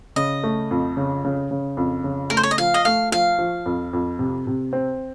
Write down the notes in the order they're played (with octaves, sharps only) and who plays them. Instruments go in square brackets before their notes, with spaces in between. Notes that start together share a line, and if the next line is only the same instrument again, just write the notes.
[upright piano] C#3 [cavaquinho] D#5
[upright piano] A3
F2
C#3
C#3
C#3
F2
C#3
[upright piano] A3 [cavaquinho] A#4
[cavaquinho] C5
C#5
D#5
[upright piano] F3 [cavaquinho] F5
[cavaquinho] D#5
[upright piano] A3 [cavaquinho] F5
[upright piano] F3 [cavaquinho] F5
[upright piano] F3
F2
F2
C3
C3
C4